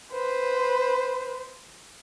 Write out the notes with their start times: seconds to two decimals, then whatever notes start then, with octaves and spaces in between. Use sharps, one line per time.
0.13 B4 C5